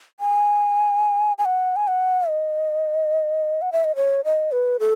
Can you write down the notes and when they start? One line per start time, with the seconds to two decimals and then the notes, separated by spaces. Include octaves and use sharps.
0.20 G#5
1.38 G#5
1.45 F#5
1.76 G#5
1.87 F#5
2.28 D#5
3.62 F#5
3.72 E5
3.84 D#5
3.96 C#5
4.25 D#5
4.52 B4
4.80 A4